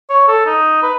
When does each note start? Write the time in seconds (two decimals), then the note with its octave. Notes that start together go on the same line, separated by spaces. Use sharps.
0.10 C#5
0.28 A4
0.46 D#4
0.83 B4